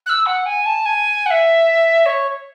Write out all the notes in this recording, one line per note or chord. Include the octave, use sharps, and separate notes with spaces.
F#6
E6
F#5
G#5
A5
G#5
F#5
E5
C#5